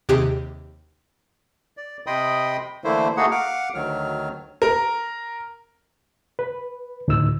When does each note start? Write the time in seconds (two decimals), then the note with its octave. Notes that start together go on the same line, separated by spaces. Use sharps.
0.09 D#2 C3 G4 G#4 F#6
1.77 D5
2.07 C3 D#5 G5 B5 C6 D#6
2.84 D3 E3 A3 A#3 E4 C5
3.17 A3 A#3 D#4 F#4 G#4 F#5
3.31 F5 F#5 D6 F6
3.74 D2 D#3 F#3 F6
4.62 A#4
6.39 B4
7.08 D2 A2 D#4 E6